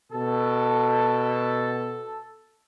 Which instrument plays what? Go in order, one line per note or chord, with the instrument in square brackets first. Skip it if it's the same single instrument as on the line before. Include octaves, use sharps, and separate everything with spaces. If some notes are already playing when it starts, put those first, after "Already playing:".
[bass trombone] B2 [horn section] A4